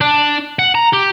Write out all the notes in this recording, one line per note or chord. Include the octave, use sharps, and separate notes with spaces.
D4
F#5
A#5
G4